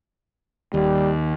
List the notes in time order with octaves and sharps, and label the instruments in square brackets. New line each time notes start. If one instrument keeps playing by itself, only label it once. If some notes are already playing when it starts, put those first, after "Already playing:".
[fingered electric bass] D#2 [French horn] G3